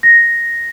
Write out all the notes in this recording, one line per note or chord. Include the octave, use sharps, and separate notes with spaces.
A#6